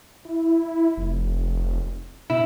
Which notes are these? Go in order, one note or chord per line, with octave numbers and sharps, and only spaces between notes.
E4
F1
B2 E4